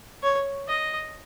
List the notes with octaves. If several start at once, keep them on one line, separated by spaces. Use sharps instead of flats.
C#5
D#5